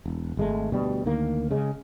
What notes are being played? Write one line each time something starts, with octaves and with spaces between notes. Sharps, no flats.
E1
G#1 G#3 A3
D2 B2 G3
D2 D#3 A#3
C#3 G#3